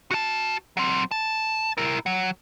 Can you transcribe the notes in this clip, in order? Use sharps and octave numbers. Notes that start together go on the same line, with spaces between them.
F#4 A5
F#3 C4
A5
E4 A#4
F#3